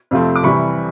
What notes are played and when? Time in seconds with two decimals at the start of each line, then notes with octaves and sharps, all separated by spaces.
0.11 F2 C3 F3 A3 C4
0.36 D6
0.43 C2 C3 E3 G3 B5 C#6